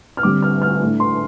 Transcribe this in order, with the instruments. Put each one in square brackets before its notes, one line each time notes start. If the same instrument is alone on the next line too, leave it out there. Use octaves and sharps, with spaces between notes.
[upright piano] F6
D3 G3 C4 D6
F6
F6
A2 A3 D4
C6